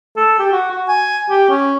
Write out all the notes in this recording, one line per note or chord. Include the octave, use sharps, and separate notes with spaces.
A4
G4
F#4
F#4
G#5
G4
C#4